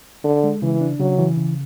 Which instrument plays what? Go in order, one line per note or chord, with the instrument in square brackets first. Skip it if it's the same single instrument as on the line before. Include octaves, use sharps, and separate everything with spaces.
[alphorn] D3 [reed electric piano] A4
[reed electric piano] G#3
[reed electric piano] C#3 [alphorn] E3
[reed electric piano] D4
[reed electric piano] C#3 [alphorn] F#3
[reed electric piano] E3
C#3